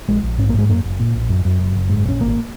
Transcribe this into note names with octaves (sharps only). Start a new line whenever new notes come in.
A#1 G#3
A#1
G#2 C#4
A#3
G#2 G#3
F#2 A#3
F#1
A#2
A#1
F#2
F#2
F#1
F#1
G#2
A#1 C#4
G#1 A#3